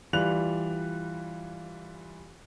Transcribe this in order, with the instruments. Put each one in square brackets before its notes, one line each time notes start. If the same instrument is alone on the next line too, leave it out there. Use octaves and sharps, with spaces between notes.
[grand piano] E3 G3 F4 F#6 F7